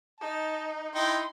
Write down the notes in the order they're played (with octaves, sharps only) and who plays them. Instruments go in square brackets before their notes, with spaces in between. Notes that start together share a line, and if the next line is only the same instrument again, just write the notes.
[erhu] D#4 [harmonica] A5
[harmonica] D#4 E4 G5 [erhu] C6